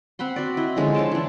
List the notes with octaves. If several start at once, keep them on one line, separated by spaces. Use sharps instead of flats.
C4 F#5 B5 C6
F#4 D5
E4 D#5
D3 F3 G#3 C#4
C5 C#5 G5 A5
E3 D4